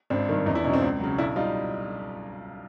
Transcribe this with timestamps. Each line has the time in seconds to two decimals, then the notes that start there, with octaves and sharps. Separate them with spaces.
0.10 G#1 C4 D4
0.29 G2 D#3
0.46 E2 C#4 D#4
0.55 D4 E4
0.64 B2 F#3 C#4 D#4
0.73 C4 D4
0.82 C#2
1.00 C#3 F#3
1.18 B1 D4 E4
1.36 G3 D#4 F4